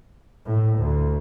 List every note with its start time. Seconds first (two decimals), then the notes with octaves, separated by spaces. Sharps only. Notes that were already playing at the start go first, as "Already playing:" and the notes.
0.45 A2
0.79 D2